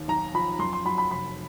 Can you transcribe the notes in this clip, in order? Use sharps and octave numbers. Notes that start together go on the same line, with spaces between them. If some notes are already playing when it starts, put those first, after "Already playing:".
Already playing: D#2
B1 A#5
F3 B5
F#2 C6
C6
F#3 B5
B5
F1 B5